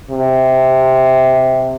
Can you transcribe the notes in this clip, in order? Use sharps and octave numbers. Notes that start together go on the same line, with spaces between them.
C3